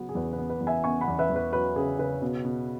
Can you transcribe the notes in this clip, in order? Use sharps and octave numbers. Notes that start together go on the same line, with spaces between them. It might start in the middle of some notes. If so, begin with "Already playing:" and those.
Already playing: C#3 F#3 B3
G#4
E2 B4
B4
B3
B4
E2
E5 G#5
B3 G#5 C#6
F#5 B5
E2
B4 E5
E2
B4
F#3 B4
C#3 G#4
C#3 B4
B2
B2